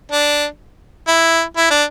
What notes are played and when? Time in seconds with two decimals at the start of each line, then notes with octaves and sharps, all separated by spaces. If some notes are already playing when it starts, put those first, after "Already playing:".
0.12 D4
1.08 E4
1.57 E4
1.70 D4